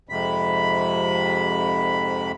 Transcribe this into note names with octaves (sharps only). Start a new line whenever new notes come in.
F2 G#2 C3 B5